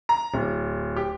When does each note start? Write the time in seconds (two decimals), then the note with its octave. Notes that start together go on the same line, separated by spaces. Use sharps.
0.09 A#5
0.34 D1
0.96 G4